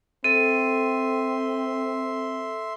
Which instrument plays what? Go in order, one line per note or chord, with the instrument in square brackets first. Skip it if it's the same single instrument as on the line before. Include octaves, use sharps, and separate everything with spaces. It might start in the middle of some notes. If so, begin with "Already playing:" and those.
[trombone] C4 [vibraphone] A4 [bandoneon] E5 C6 [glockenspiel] D#7